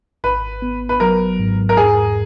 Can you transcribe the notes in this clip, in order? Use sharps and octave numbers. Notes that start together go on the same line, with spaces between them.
G#1 B4
B3
B4
F#3 A#4
G#2
A#4
E2 G#4